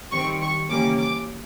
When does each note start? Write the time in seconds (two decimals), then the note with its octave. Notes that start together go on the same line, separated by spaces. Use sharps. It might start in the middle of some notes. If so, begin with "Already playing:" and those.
0.12 D#3 G3 C4 C#6
0.41 C#6
0.69 C#3 E3 G3 A#3 C#4 D6
0.97 D6